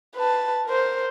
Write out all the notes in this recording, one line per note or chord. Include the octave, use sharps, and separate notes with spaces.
B4 A5
A#4 C5